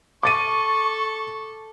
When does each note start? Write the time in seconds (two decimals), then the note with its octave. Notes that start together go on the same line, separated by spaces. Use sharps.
0.23 A4 C#6 D6 A6 D#7